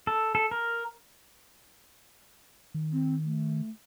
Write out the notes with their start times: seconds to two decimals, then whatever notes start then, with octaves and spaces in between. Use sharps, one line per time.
0.07 A4
0.35 A4
0.51 A#4
2.74 D#3
2.93 C4
3.25 A3